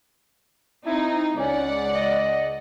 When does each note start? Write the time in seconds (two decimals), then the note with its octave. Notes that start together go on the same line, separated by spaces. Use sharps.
0.86 C4 D#4 E4
1.39 C#2 C#4 D5 F#5
1.95 D#5